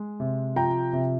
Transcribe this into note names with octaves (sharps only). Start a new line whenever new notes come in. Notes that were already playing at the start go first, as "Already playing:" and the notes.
Already playing: G#3
C3
F3 G5 A#5
C3